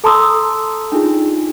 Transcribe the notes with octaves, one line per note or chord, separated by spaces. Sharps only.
A4 A5 A#5 C6 D#6 E6
D4 D#4 F4 G#4